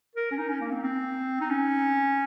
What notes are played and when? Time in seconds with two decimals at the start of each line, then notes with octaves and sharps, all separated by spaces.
0.16 A#4
0.31 C#4
0.38 D#4
0.49 C#4
0.61 A#3
0.72 C4
0.83 C4
1.41 D#4
1.51 C#4